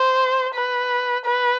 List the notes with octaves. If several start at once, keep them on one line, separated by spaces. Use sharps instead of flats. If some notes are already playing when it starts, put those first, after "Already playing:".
Already playing: C5
B4
B4